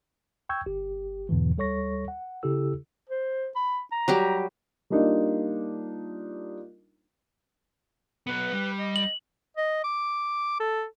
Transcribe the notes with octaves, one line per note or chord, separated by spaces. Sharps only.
G5 C#6 E6 G6 G#6
G1 G4
E2 G#2 B2 D3 E3
D2 G3 A4 C#5 C#6 A#6
F#5
C#3 E4 G4 A4 E6
C5
B5
A#5
F#3 G3 G4
G3 A#3 D4 D#4 F4
F#3 B3 B4
G3
D#5
F#7
D#5
D6
A4